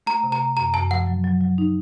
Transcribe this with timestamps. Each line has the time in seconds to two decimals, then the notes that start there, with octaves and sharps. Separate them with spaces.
0.06 A3 A#5
0.23 C3
0.32 A#5
0.40 C3
0.57 F#2 A#5
0.74 F#2 A5
0.91 F3 F#5
1.07 F#3
1.24 F#3
1.41 F#3
1.58 D#4